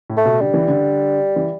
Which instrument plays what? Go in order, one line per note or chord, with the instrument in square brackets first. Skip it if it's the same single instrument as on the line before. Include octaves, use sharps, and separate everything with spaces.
[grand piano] A2
[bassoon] A3
[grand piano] B2
[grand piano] D3 [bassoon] G3
[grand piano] E3
D3
E3